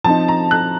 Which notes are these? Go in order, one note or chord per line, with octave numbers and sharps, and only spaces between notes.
F3 C4 D#4 A5
A#5
F#6